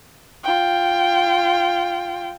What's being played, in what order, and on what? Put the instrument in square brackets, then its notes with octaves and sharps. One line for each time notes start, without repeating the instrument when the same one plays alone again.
[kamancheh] F4 G5